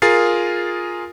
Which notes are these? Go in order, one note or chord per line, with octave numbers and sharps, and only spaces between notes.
F4 G#4 A#4 A6 C7